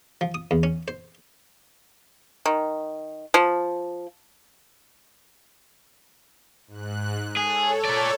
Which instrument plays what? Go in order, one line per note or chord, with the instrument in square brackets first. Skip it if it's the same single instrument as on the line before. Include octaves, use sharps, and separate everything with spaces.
[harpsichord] F3
D#6
E2
C#4
C5
[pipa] D#3
F3
[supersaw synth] G#2 F#6
[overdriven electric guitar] G#4 [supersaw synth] A4 C#5
[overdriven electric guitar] A#4 D5